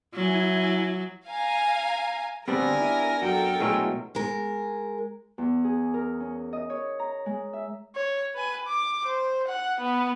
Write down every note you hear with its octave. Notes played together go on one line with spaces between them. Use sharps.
F#3 E4 G#5
F5 G#5 A#5
D2 G3 B3 C4 D4 A#4 G#5 A#6
E4
F#2 F#4 A4 A#4 G5
B2 F#3 G#3 A3 E4 G#4
G#3 A#4
E2
G#4
A#4
C#4
D#5
C#5
A#5
G#3
E5
C#5
B4 G#5
D6
C5
F#5
B3